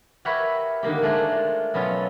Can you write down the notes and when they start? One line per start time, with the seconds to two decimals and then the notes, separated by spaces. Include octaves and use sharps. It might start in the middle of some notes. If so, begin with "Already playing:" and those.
0.25 F#4 G4 A#4 B4 C#5 E5
0.83 D3 D#3 A#3 G4
1.02 G#3 A3 D4 A#4 C5
1.32 F4
1.74 B2 F#3 B3 C#4 F4 A4